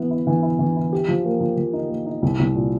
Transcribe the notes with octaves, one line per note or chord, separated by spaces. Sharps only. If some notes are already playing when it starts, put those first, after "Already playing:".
Already playing: E3 B3 E4
E4
E3
E4
E3
E4
G4
F3
A#3
F3
F3
D#4
A#3
D#4
C2
C2
A#2